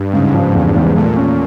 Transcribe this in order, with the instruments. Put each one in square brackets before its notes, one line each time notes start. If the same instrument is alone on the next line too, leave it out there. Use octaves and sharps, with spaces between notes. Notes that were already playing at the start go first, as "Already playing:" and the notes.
Already playing: [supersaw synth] G2
[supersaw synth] G#2 [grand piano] C#3
[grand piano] F3
E2
E2
[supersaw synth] A#2 [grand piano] A3
[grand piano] C#4